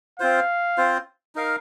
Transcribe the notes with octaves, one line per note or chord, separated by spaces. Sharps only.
C4 F4 C5 F5
C4 F4 C5
D#4 A#4 F5